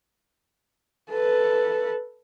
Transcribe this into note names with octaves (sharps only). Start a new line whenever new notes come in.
A4 B4